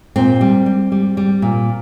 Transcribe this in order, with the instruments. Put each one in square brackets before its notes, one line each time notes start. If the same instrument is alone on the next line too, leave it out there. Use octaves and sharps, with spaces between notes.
[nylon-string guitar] A#2 C4
G3
G3
G3
G3
A#2